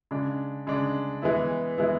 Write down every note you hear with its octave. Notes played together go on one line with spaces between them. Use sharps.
C#3 G#3 D4
C#3 G#3 D4
E3 G#3 B3 E4
E3 G#3 B3 E4